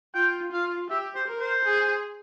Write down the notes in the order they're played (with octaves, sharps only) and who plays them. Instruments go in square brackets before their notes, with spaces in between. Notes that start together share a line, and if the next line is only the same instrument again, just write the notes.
[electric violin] F4 [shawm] G5
[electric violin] F4 [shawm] F5
[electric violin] G4 [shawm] E5
[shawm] C5
[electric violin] A#4
[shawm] C5
[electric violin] G#4